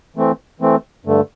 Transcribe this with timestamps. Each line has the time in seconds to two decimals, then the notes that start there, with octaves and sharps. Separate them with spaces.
0.16 E3 A3 C4
0.60 E3 A3 C4
1.05 G2 D3 A3